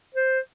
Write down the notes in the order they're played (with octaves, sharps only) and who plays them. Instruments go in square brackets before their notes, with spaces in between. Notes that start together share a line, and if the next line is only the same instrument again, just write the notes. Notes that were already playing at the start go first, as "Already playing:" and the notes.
[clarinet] C5